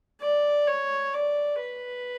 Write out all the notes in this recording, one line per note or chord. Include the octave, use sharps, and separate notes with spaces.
D5
C#5
D5
B4